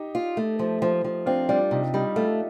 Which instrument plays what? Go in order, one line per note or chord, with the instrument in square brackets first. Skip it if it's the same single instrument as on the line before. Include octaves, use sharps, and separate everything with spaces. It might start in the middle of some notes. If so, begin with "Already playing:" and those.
Already playing: [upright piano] D#4 G4
[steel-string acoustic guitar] F4
A3
F3
F3
F3
[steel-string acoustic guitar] C4 [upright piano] D4 F4
[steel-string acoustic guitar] G3 [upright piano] D4 F4
[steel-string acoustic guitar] C3 [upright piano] D#4
[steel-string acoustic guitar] G3 [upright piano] D#4 G4
[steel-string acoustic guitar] A3 [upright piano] F4 A4